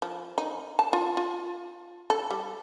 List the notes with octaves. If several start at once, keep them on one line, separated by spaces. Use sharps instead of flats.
F3
D#4
A5
F4
F4
A4
G3